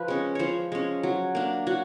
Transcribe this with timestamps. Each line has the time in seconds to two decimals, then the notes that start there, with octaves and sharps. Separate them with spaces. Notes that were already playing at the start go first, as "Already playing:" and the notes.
Already playing: F3 B4
0.08 G#3 C#4
0.35 F3 C5 C#5
0.72 G#3 C#4
1.03 F#3
1.35 A#3 D4
1.67 F#3 F#4